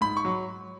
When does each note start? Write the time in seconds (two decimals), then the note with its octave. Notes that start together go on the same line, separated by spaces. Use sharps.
0.01 G#2 B5
0.17 C#6
0.25 F#3